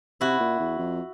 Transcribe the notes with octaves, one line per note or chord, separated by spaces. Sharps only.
C3 E4 F#4
A#2
E2
F2